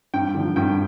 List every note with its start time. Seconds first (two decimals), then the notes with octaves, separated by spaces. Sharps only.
0.14 G2 G5
0.35 D3 F3
0.56 G2 G5